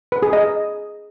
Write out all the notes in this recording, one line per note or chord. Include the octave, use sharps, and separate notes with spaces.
B4
G#4
D#5